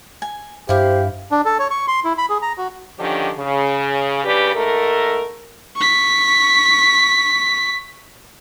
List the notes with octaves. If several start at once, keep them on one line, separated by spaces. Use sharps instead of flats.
G#5
G2 E4 G4 C5 F5
D4
A4
C#5
C#6
C6
E4
B5
G#4
A#5
F#4
D3 D#3 F3 C#4 D4 G4
C#3
G2 C#3 G4 B4 D5
G#2 A3 A4 A#4
C#6 B6